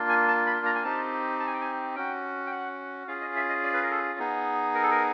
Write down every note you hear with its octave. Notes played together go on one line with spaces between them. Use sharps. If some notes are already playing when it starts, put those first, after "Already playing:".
Already playing: A#3 D4 F4
G#5
A5
B5
A#5
G#5
C4 D#4 G4 A5
A5
G#5
G5
G#5
C#4 F#4 G5
G5
F#5
C#4 F4 G#4 F5
D#5
E5
D#5
D5
B4
A#4
A4
B3 D#4 G#4
A#4
A4
A#4